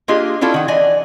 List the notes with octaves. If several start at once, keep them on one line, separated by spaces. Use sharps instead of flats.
A#3 D4 F4 G4 G#4 D#5
C#4 D4 E4 F4 A4
D#3 F#5
E3 D5 D#5 G#5